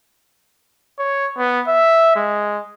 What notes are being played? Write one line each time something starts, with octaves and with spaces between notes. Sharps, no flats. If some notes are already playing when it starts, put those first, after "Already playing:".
C#5
B3
E5
G#3